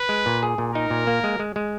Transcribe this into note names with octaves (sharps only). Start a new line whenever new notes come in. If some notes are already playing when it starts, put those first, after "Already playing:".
Already playing: B4
G#3
A#2
G#4
A#2
D#4 A#4
A#2
A#3
G#3
G#3
G#3